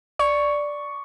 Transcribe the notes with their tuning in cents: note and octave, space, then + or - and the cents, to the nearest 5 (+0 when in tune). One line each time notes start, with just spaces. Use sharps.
D5 +0 C#6 +5